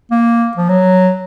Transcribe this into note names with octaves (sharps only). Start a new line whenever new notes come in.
A#3
F3
F#3